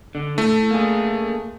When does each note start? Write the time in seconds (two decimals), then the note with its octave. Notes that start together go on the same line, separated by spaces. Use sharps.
0.15 D3
0.38 A2 A3
0.71 A#3 G#4